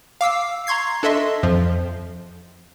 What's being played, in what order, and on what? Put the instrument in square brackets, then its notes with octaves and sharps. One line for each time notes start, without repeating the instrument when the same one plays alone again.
[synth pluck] F5 D6 E6 C7
A#5 C6 C#6 G#6 C7
D4 A4 D#5 E5 C6
F2 F3